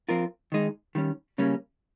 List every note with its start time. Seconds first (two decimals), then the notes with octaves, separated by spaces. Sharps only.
0.09 F3 C4 F4 A#4
0.52 D#3 G#3 D#4
0.95 D#3 G3 C#4
1.38 C#3 G3 A#3 C#4